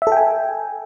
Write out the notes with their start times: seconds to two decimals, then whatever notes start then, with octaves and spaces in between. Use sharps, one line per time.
0.02 E5
0.07 A4
0.12 G5
0.17 G#5